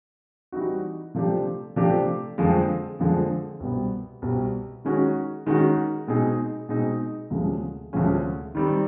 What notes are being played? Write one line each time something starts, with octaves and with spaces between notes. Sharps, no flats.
E3 G3 C4 D#4 F#4
C3 F3 A3 D4 G4
C3 F3 A3 D4 G4
F2 D3 F3 G#3
F2 D3 F3 G#3
C2 B2 G3 B3
C2 B2 G3 B3
D#3 G#3 C#4 F#4
D#3 G#3 C#4 F#4
B2 G#3 C4 D#4 G#4
B2 G#3 C4 D#4 G#4
D2 C3 F3 G#3 C#4
D2 C3 F3 G#3 C#4
D#3 G3 C4